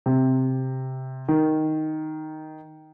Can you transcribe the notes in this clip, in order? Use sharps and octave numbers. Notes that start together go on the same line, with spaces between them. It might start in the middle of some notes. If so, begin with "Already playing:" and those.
C3
D#3